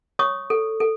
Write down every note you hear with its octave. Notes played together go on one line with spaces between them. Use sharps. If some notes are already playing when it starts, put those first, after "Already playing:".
C#5 C#6 D#6
A4
A4